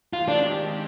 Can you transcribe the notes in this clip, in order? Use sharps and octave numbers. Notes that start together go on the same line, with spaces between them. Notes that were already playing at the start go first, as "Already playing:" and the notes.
D#3 G#3 C4 F4 G4
D4